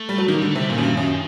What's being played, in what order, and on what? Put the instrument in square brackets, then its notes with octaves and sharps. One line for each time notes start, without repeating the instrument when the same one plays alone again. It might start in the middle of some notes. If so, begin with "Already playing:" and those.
Already playing: [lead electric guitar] A3
[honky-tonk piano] G3
F#3
[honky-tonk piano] D#3 [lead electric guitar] A#3
[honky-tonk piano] D3 [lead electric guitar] G3
[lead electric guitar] A3
[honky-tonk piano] C3 [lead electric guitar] G3
[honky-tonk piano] A#2 [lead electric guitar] D#3
[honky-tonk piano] F#2
G2
F#2